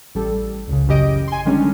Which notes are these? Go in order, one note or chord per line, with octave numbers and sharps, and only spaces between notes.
A1 G3 A4
C#2 C#3
A1 F#2 C#3 G4 D#5 D7
G#5 C6
D3 D#3 G3 G#3 C#4 D4